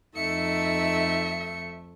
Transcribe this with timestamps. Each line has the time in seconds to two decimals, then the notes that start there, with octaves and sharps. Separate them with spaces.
0.15 F2 A3 D#4 E5 C#7